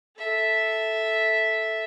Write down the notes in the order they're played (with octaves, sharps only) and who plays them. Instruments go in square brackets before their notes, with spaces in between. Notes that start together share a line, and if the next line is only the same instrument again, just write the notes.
[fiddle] A4 E5